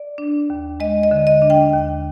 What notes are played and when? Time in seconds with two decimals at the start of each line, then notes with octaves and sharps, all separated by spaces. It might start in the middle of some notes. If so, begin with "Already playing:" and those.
Already playing: D5
0.18 D4
0.50 D#2
0.80 G#3 D#5
1.03 D#5
1.11 D3
1.27 D#5
1.42 D4
1.50 G5
1.73 D#2